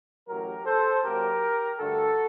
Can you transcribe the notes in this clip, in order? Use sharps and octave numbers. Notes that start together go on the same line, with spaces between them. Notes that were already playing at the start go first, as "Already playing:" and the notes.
A1 A2 F#3 G4 A#4
A4 C5
F#2 F#3 A#3 G4 A#4
G2 D3 A3 F#4 A4